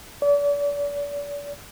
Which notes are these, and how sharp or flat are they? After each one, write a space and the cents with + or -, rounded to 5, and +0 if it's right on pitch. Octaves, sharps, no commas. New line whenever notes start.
D5 -40